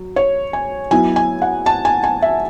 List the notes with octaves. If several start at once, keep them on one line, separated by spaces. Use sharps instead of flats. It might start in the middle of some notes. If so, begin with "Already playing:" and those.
Already playing: F#3
C#5
G#5
F#3 B3 E4 G#5
G#5
F#5
A5
G#5
G#5
E5